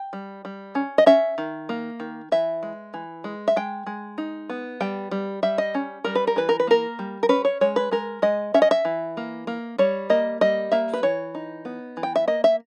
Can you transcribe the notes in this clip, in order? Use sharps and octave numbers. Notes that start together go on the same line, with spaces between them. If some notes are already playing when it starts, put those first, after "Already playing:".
Already playing: G5
G3
G3
C#4
D#5
C#4 E5
D#3
A#3
D#3
E3 E5
G#3
E3
G#3
E5
G#3 G5
G#3
D#4
B3
G3 G5
G3
G3 E5
D#5
C#4
G3 A#4
B4
A#4
E3 B4
A#4
B4
A#3 A#4
G3
A#4
C#4 B4
C#5
G#3 C#5
B4
G#3 A#4
G#3 D#5
C#4 E5
D#5
E5
E3
A#3
A#3
G3 C#5
A#3 D#5
G3 D#5
A#3 E5
B4
E3 C#5
D#4
B3
E3
G5
E5
A#3 D#5
E5